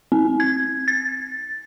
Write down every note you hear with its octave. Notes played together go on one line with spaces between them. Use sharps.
C4
G#6
A6